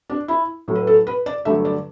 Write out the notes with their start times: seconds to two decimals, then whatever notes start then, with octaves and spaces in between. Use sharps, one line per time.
0.10 D4
0.28 E4
0.68 A2 F#3 A3
0.76 B4
0.87 A4
1.07 B4
1.26 D5
1.45 G2 D3 F#3 A3 E5
1.65 D5